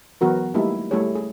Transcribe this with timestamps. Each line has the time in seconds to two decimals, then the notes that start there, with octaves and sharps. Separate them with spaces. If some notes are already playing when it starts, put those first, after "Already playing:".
0.21 E3 F#3 B3 F#4 A#4
0.54 G3 A3 A#3 D#4 E4 G4
0.91 G3 A3 E4 G4 G#4 C#5
1.15 G#4